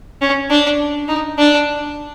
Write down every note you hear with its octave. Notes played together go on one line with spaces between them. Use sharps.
C#4
D4
D#4
D4